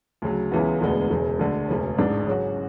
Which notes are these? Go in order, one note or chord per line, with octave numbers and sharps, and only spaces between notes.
D2 C#3 F#3
C#2 C#3 E3 B3
E1 D2 D3 G#3 B3
E1 E2 C#3 G#3
D2 D3 G#3
E1 D2 C#3 G#3 C#4
A1 G#2 G#3 D4
C#3 F#3 C#4 F#4